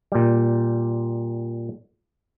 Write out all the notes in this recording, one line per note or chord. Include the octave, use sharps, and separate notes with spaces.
A#2 G3